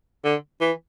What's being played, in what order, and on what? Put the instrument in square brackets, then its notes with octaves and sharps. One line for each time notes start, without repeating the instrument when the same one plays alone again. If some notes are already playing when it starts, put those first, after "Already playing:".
[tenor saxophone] D3
E3